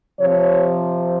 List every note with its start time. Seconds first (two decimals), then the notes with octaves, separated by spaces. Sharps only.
0.20 C3 F3 C#5